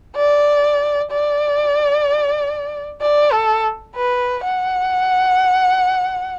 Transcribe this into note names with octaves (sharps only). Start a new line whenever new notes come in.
D5
D5
D5
A4
B4
F#5